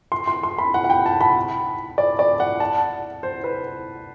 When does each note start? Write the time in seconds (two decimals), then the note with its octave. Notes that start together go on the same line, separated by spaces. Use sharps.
0.12 C6
0.27 C6
0.43 C6
0.58 B5
0.74 F#5
0.84 F#5
0.90 G5
1.06 A5
1.21 B5
1.98 D5
2.19 D5
2.40 F#5
2.60 A5
3.23 C5
3.44 B4